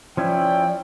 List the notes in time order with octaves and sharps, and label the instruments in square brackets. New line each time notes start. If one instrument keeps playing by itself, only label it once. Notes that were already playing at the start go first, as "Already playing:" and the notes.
[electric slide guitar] F3 C#4 E4 [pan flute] D5 [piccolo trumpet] G5